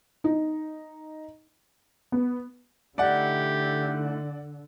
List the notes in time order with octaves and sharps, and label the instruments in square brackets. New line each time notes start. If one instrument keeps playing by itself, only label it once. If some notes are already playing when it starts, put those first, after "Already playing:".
[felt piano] D#4
[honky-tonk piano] B3
[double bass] D3 [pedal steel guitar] A3 D#4 E4 [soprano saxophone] G4 [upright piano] D5 F#5